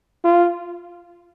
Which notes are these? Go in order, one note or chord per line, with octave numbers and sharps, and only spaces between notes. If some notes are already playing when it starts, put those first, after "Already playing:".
F4